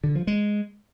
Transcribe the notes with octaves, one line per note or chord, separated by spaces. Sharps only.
D3
F3
G#3